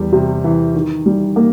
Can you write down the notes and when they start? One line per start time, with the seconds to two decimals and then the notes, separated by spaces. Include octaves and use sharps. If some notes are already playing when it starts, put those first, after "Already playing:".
Already playing: E2 G3
0.13 C3
0.44 E3
0.75 D#3
1.06 G3
1.36 A#3